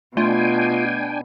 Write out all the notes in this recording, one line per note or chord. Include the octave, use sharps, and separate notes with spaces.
B2 A3 D4 F4 G5 G#5